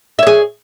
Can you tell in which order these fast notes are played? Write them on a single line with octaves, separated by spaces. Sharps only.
E5 C#5 G#4